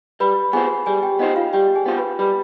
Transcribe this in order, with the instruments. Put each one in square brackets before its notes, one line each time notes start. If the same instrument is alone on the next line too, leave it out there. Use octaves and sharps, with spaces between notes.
[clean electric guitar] G3 [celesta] B4 B5
[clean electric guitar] B3 F4 C5 [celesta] G#4 G#5
[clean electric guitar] G3 [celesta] G#4 G#5
[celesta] G4 G5
[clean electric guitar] B3 F4 C5 [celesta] D#4 D#5
[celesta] F4 F5
[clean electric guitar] G3 [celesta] G4 G5
[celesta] G#4 G#5
[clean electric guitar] B3 F4 C5
[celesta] B4 B5
[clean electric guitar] G3 [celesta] B4 B5